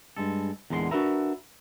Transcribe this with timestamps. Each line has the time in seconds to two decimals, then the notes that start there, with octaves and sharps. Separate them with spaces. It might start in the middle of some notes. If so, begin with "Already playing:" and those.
0.17 G2 G#3 A4
0.70 E2 A#2 D3 G#3 A#5 C6
0.91 D4 F#4 A#4 B4 E5 A#5